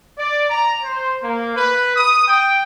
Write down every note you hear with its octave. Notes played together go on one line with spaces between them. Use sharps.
D5
A#5
C5
A#3
B4
D#6
G5